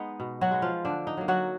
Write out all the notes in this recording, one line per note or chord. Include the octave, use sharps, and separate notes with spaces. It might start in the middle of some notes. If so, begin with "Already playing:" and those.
Already playing: G#3 B3 D#4
B2
F#3 F#4
G#3 B3
F3 F4
D3 D4
D#4
F#3 A#3
F#3 F#4